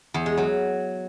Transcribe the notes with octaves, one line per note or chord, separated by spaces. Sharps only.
E2
G#3
F#3